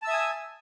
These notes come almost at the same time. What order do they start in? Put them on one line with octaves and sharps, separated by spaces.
A5 E6 E5 D#6 G#5